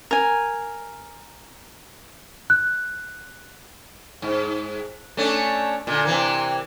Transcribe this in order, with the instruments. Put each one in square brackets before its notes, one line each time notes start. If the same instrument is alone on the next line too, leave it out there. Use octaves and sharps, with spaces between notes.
[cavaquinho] A#4 G#5
[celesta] F#6
[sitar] G#2
A3 C#4 D4
A#2 D3
C3 E3 A#3